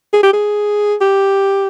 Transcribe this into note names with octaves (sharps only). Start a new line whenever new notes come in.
G#4
G4
G#4
G4